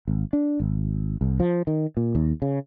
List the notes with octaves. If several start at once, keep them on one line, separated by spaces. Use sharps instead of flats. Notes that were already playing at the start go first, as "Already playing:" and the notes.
G#1
D4
G#1
C2
F3
D#3
A#2
D#2
C#3